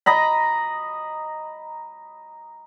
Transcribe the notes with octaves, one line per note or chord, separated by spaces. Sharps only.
D#5 A#5 B5